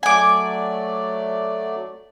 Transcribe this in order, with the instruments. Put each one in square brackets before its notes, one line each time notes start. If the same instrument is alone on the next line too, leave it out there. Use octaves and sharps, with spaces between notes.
[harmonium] F#3 A3 D5 [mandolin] G#5 D6